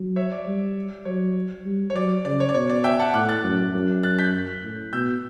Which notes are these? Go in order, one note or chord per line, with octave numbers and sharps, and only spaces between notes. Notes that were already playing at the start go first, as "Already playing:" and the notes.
Already playing: F#3
C#5 E5
D5
G3
F#3 C#5
G3
C#5
F#3 D5
C#3 D5
C#5
D5
B2 C#5
D5
E5 G5
F#5 A5
A2 D6 F#6
F#6 A6
F#2
F#2
F#6 A6
G6 B6
A2
B2 E6 G6